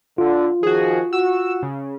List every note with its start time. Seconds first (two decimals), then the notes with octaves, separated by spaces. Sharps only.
0.18 D3 F4
0.63 D#3 F3 F#4 G#4
1.13 F#4 E6
1.63 C#3